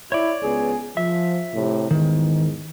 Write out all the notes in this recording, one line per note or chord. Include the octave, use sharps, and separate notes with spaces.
E4 C#5 D5
C#2 B3 G#4
F3 E5
A2 C3
E2 G#2 D#3